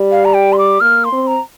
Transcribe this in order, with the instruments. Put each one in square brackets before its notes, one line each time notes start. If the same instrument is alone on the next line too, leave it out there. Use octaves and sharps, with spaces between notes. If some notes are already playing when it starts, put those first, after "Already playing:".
Already playing: [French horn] G3
[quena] F5
A#5
G5
C6
D6
[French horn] A#3 [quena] F6
[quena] C6
[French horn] C4
[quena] A#5